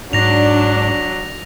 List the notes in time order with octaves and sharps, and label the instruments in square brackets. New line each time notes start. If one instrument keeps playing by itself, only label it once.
[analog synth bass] G#2 [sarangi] F#3 [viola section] D4 [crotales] A#6 F7